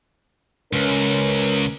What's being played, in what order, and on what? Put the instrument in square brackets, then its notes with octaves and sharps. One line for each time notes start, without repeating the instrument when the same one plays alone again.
[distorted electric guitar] C#2 [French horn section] C#4 A#4 B4